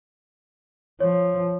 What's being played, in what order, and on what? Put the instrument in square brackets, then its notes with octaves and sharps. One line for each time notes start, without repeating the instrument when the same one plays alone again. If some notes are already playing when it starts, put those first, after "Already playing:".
[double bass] F3 [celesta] C#5